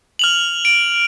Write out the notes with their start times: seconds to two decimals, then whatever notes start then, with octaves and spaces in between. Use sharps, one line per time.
0.19 F6 F7 F#7
0.65 D7